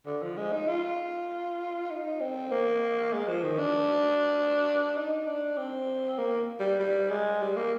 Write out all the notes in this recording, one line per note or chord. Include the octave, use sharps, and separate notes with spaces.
D3
F3
G#3
D#4
F4
D#4
C4
A#3
G#3
F3
D#3
D4
D#4
D4
C4
A#3
G3
G3
G#3
G3
A#3